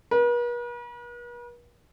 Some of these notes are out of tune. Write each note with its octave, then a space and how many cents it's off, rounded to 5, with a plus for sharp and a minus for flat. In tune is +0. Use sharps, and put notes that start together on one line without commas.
B4 -45